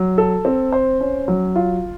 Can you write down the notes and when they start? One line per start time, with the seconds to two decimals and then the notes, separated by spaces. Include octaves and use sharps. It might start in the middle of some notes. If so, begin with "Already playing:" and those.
Already playing: F#3
0.18 A4
0.45 C4
0.72 C5
1.01 C#4
1.28 F#3
1.56 F4